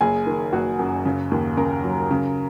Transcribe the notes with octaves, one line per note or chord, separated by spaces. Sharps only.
F#1 G#4 G#5
D#3
F#1 F#4 F#5
F#2
C#3
D#2
C#3 A#4 A#5
F#3
C#3